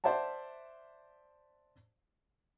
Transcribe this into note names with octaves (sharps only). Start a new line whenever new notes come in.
C5 D5 E5 F#5 A5